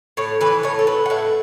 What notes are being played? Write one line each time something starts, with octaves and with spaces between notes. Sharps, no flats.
A2 C#5
E3 B4
A2 C#5
A4
B3 B4
F#5
A2 E5